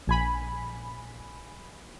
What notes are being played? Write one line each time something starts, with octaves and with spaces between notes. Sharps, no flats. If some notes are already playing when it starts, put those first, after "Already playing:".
A#1 G#5 B5